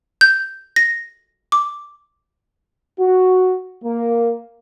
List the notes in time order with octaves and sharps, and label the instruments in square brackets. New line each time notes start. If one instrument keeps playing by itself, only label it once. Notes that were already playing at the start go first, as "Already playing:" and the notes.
[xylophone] G6
A#6
D6
[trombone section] F#4
A#3